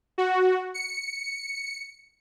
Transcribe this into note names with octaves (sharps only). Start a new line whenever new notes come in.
F#4
C#7